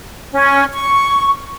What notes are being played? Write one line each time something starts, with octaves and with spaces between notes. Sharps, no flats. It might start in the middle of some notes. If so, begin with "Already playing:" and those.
C#4
C#6